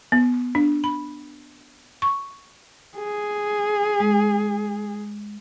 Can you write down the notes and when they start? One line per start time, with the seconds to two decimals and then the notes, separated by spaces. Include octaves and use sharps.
0.12 B3
0.55 D4
0.84 B5
2.02 C#6
2.98 G#4
4.00 G#3